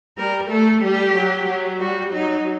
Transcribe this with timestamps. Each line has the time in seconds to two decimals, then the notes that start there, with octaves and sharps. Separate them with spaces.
0.18 G3 A#4
0.50 A3 A4
0.83 G3 G4
1.16 F#3
1.48 F#3
1.80 G3 F#4
2.13 F#3 D#4